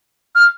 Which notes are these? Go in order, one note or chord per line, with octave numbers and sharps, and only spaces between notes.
F6